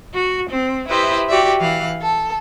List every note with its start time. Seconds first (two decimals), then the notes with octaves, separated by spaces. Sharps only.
0.14 F#4
0.51 C4
0.90 E4 G4 B4 C5 D#5 E5
1.29 F#4 G4 D5 E5
1.60 E3 F5 F#6
2.01 A4